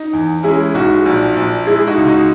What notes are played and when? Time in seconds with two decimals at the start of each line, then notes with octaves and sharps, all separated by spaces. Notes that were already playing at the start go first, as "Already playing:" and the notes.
Already playing: D#4
0.13 E2
0.43 G#3 C#4 E4
0.74 B1 D#4 F#4
1.06 A#1
1.37 A#1
1.66 G#3 E4 G#4
1.87 D#4 F#4
1.98 C#2
2.08 D#4 F#4